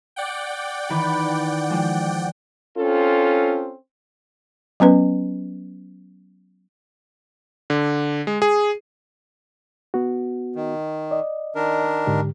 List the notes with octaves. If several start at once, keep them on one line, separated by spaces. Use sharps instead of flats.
D5 F#5 G5
D#3 E3 B4
F3 G#3
C4 C#4 F4 A4
F#3 B3 C#4 B4
D3
G#3
G#4
B3 F#4
D#3
D5 D#5
D#3 D4 A#4
G#2 D3 G4